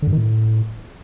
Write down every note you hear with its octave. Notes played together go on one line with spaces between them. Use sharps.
D3
G2
D#3
A2